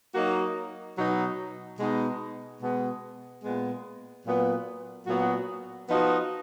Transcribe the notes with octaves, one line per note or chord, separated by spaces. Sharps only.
F#3 A#3 D#4 F#4
B2 F#3 B3 D#4
B2 G#3 B3 D#4
B2 G#3 B3
A#2 G#3 B3
A#2 F#3 B3
A#2 F#3 B3 F#4
F3 B3 D#4 F#4